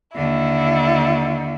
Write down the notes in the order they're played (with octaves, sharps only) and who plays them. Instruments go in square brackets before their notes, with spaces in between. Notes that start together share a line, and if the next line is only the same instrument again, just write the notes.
[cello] D#2 D3 [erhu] E4